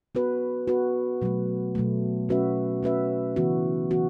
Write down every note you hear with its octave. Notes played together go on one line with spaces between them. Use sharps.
B3 F#4 B4
B3 F#4 B4
B2 F#3 A3
B2 F#3 A3
A3 C#4 F#4 B4 E5
A3 C#4 F#4 B4 E5
C#3 E3 B3 F#4
E3 B3 F#4